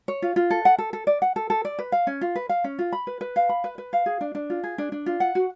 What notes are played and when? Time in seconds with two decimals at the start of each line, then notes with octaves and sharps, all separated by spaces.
0.08 C#5
0.22 F4
0.36 F4
0.51 A4
0.65 F#5
0.78 A4
0.93 A4
1.07 D5
1.22 F#5
1.36 A4
1.50 A4
1.65 D5
1.79 B4
1.92 F5
2.07 C#4
2.21 F4
2.36 B4
2.49 F5
2.64 C#4
2.79 F4
2.93 B5
3.07 B4
3.21 B4
3.36 F5
3.49 B5
3.64 B4
3.78 B4
3.93 F5
4.06 G#4
4.21 D4
4.35 D4
4.50 F4
4.64 G#4
4.78 D4
4.92 D4
5.06 F4
5.20 F#5
5.35 F#4